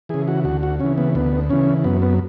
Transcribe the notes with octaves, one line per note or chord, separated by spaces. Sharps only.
C#3 E3 G#4
F#4
D2 F#4
F#4
C#3 E3 C#4
B3
D2 B3
C#3 E3 C#4
F#2 B3
B3